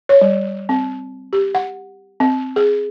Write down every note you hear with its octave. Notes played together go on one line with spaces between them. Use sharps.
C#5
G3
C4
G4
F#5
C4
G#4